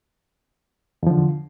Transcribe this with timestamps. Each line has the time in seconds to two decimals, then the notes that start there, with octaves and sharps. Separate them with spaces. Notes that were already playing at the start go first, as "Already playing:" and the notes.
1.03 E2
1.07 F3
1.10 D3